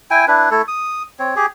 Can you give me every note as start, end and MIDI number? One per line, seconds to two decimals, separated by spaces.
0.11 0.25 64
0.11 0.25 79
0.11 0.25 80
0.28 0.50 62
0.28 0.50 64
0.28 0.50 71
0.51 0.62 57
0.51 0.62 64
0.51 0.62 69
0.68 1.03 87
1.19 1.35 60
1.19 1.35 73
1.36 1.46 67
1.36 1.46 68